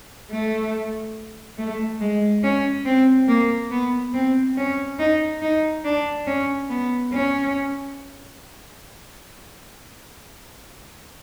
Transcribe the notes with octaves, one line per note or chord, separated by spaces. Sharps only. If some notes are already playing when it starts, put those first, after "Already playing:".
A3
A3
G#3
C#4
C4
A#3
B3
C4
C#4
D#4
D#4
D4
C#4
B3
C#4